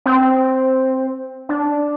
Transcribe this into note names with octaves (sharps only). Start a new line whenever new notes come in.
C4
D4